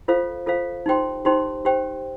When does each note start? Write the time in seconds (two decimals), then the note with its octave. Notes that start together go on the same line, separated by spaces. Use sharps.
0.08 F4 A4 C5 F5
0.46 F4 A4 C5 F5
0.86 D#4 G4 C5 G5 C6
1.25 D#4 G4 C5 G5 C6
1.65 G4 C5 G5